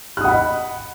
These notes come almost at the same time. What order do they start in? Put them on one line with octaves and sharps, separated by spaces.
F#6 D#6 F#5 B5 D#5